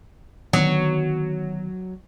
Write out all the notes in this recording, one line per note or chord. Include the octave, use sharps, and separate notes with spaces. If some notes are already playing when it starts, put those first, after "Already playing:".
D3 D#3 F#3 B3